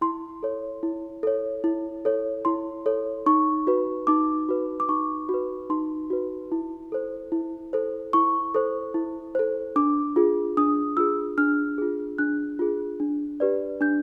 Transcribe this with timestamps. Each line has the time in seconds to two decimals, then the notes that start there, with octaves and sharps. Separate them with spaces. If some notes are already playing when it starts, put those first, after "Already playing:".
0.01 E4 C6
0.43 A4 C#5
0.83 E4
1.23 A4 C#5
1.64 E4
2.05 A4 C#5
2.45 E4 C6
2.86 A4 C#5
3.26 D#4 C#6
3.67 F#4 B4
4.07 D#4 D6
4.49 F#4 B4
4.80 D6
4.89 D#4 C#6
5.29 F#4
5.34 B4
5.70 D#4 C6
6.10 F#4 B4
6.52 E4
6.92 A4 C5
7.32 E4
7.73 A4 C5
8.13 E4 C#6
8.54 A4 C5
8.94 E4
9.35 A4 C5
9.76 D4 D6
10.16 F4 G#4
10.57 D4 D#6
10.97 F4 G#4 E6
11.38 D4 F6
11.78 F4 G#4
12.18 D4 F#6
12.59 F4 G#4
13.00 D4
13.40 G4 B4 D5
13.81 D4 G6